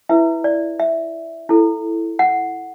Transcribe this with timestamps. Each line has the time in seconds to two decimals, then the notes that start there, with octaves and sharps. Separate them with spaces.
0.09 E4 B4 E5
0.44 D5
0.80 E5
1.49 E4 A4
2.19 F#5